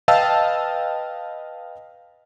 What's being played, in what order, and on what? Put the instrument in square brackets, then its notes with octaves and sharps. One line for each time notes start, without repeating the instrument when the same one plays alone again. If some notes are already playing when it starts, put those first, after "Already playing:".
[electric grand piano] B4 D#5 F5 G5 A5 E6